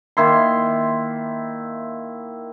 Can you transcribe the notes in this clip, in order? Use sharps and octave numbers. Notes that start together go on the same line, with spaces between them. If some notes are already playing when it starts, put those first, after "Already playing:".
D#3 A#3 E4 C6